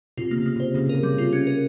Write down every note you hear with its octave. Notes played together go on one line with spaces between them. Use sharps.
C3 F4
A#3
C#3
A#3
C3
C5
C#3 A#3
C3
C#3 A#4
G3
C3
F4
C#4
A#4